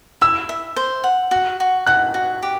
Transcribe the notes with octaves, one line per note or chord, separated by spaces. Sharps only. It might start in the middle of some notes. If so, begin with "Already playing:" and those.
E4 E6
E5
C5
F#5
F#4
F#4
F#4 F#6
F#4
G4